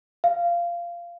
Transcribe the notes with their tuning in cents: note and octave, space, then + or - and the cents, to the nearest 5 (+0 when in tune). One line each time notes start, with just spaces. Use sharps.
F5 -15